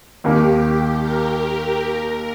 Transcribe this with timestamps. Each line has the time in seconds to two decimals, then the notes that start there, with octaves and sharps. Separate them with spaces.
0.23 D#2 D#3 A#3 G4
1.02 A#4
1.80 A#4